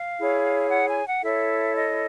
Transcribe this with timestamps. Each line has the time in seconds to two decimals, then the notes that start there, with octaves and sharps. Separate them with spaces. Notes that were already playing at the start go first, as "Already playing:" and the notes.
Already playing: F5
0.17 E4 G#4 C#5
0.70 F#5
0.88 G#5
1.05 F#5
1.23 E4 A4 C#5 E5
1.75 D#5